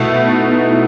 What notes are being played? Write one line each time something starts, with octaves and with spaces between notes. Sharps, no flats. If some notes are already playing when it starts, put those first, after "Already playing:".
Already playing: B2 A3 B3 E4 A4
D#4
E4